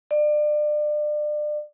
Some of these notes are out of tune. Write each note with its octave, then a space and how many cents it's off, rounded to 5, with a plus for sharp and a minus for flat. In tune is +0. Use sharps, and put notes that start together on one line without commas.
D5 +30